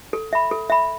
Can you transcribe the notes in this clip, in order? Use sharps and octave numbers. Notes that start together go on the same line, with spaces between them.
A4
E5 B5
A4
E5 B5